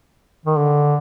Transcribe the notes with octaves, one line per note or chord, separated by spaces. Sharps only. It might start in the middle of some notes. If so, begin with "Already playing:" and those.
D#3
D3